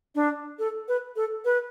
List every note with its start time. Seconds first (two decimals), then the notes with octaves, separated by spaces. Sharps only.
0.15 D4
0.59 A4
0.88 B4
1.16 A4
1.45 B4